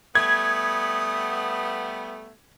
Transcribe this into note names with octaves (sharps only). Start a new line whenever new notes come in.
G3 A3 B3 D#6 G#6